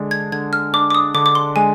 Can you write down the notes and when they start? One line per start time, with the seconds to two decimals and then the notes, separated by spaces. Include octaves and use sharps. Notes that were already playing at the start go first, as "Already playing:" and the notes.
Already playing: D3 G#3 D4
0.11 G#6
0.32 D3 G#6
0.53 F6
0.73 D4 D6
0.90 D6
0.95 D#6
1.14 D3 D6
1.26 D6
1.35 C6
1.56 G#3 G#5